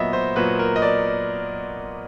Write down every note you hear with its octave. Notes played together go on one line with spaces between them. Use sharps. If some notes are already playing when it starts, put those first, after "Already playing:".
Already playing: A#2 F#3 B3 D#5 E5
C5
A#2 F#3 B3 B4
A#4
D#5
D5